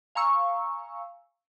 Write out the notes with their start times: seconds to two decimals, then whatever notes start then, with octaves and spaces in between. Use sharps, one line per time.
0.15 F5 G#5 A#5 C#6 E6